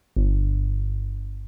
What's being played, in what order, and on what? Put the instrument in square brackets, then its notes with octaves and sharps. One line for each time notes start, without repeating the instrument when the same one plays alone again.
[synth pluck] G1